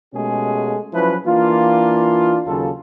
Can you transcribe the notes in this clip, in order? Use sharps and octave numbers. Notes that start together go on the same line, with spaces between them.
B2 G#3 A3 C#4 G4 G#4
F3 F#3 C#4 E4 B4
E3 A#3 D4 F4
D#2 C#3 F#3 F4 A4